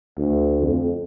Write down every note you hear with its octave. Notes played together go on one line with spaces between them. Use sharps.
D2
F2